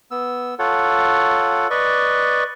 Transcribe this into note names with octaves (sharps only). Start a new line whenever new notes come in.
B3 E6
F4 A4 C#5 F#5
B4 D5 D#5 C#6